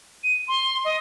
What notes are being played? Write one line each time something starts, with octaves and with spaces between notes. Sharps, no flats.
D#7
C6
D#5